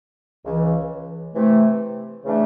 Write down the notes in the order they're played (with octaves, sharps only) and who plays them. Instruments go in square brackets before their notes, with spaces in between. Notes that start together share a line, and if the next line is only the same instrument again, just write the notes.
[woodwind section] C#2 C#3 E3
C3 E3 A3
C#3 E3 A3 D4